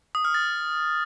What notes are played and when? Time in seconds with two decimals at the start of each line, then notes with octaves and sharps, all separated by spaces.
0.15 D#6
0.25 F6
0.34 A6